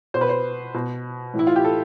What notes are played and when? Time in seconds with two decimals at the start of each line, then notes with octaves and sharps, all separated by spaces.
0.14 B2 C5
0.21 B4
0.29 C5
0.74 B2
1.34 A2 E3
1.39 E4
1.47 F4
1.56 G4
1.65 A4